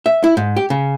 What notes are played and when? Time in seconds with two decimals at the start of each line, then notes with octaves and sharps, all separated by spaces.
0.06 E5
0.24 E4
0.37 G#2
0.56 G4
0.70 C#3